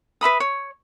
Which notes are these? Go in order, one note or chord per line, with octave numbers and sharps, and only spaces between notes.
B4 E5 B5 D#6
C#5